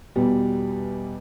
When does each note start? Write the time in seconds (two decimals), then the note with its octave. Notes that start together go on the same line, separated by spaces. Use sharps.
0.16 E2 B2 G3